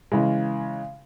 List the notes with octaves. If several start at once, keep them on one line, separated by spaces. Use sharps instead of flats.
C#3 E3 G#3